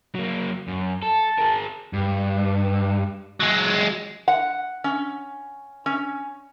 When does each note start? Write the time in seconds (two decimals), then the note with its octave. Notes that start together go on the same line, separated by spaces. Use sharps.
0.15 F#3 A#3
0.68 F#2
1.03 A4 A5
1.38 G#4 A#4
1.93 G2
3.40 F#3 G#3
4.28 F#5
4.84 C#4
5.86 C#4